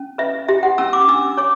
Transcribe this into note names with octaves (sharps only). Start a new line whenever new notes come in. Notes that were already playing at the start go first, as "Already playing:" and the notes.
Already playing: C#4
B4 E5
G4 E5
F#5
C#4 E6
D6
D4 E6
C#5 D6